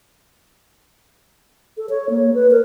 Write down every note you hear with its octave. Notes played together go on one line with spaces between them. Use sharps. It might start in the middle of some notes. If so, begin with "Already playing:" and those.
A4
C#5
A#3
B4
A#4